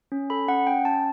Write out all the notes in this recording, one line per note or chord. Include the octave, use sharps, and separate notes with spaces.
C#4
A4 B5
C#4 F#5
C#4 G5
C#4 A5